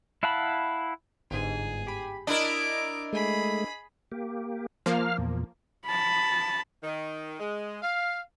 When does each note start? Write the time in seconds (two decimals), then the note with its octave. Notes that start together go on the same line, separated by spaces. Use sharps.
0.23 E4 F5 F#5 A5 B5
1.31 G1 G#2 G#4
1.87 G4 B5
2.27 D4 E4 A#4 D#5 D6
3.13 G#3 A3 G#4 B5
4.12 A#3 G4
4.86 F3 A#3 F5 F6
5.18 E2 A#2
5.86 A5 B5
6.83 D#3
7.40 G#3
7.82 F5